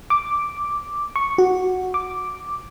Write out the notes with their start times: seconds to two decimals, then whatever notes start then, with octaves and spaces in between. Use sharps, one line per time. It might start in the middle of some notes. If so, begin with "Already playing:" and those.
0.10 D6
1.16 C#6
1.38 F#4
1.94 D6